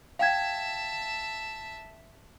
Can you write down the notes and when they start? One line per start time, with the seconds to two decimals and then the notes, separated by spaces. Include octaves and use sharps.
0.19 E5 F5 G5 A5 G#6